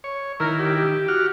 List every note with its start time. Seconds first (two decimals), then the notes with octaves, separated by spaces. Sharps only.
0.04 C#5
0.40 D#3 E4 A#4
0.59 G4
1.08 F#4 F6